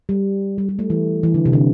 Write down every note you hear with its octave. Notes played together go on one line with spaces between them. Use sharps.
G3
G3
G3
A3
E3
E3
D3
C3
D3